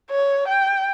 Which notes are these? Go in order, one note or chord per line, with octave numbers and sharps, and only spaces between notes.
C#5
G5